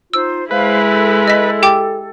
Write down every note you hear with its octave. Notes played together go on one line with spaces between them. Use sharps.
D#4 F4 C5 E6
G#3 E4 B4 C5 F5
A4
D#5 B6
G4 G5 D6